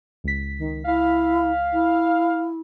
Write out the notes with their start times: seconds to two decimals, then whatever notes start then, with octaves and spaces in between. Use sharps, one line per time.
0.24 C#2 B6
0.58 D#3
0.85 E4 F5
1.73 E4